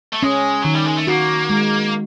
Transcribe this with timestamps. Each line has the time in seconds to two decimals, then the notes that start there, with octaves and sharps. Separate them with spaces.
0.13 A3
0.23 G#3 C#4
0.62 D#3 F#3
0.74 G3
0.85 G#3
0.96 A3
1.07 A#3 F#4
1.50 G#3